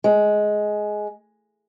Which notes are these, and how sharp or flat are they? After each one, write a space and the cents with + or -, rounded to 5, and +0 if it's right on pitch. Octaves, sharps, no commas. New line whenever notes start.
G#3 +10